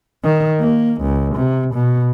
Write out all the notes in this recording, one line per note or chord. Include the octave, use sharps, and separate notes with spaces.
D#3
A#3
C#2
C3
B2